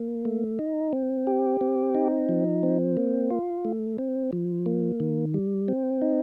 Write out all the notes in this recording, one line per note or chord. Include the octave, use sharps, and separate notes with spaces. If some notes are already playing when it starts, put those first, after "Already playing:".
Already playing: A#3
A3
D#4
C4
G4
C4
D#4
F3
C4
A#3
F4
A3
C4
F3
A#3
D#3
G3
C4
D#4